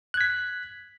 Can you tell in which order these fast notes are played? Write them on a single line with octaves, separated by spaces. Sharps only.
F#6 G#6 B6